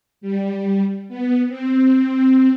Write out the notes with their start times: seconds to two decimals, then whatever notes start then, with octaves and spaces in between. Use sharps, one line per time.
0.21 G3
1.08 B3
1.48 C4